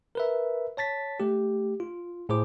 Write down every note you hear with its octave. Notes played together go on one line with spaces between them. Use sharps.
A#4 B4 E5
C#5 A5 A6 B6
A3 G4
F4
A2 G#4 C5 D6